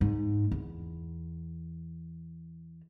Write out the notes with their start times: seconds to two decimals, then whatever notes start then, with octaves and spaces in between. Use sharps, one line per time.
0.01 G#2
0.51 E2